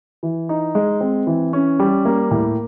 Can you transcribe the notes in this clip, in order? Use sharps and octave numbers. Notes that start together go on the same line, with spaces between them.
E3
D#4
G#3
C4
E3
C#4
G3
A#3
A2